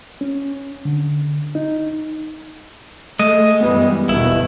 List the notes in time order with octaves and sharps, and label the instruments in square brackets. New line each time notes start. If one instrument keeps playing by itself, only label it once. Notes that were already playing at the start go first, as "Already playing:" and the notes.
[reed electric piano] C#4
D3
D#4
[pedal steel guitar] G#3 D#5 [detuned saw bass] A3
[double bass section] F#2 E3 G3 [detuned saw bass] B3
[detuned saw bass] G1 [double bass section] D#2 B2 D#3 [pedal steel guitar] E4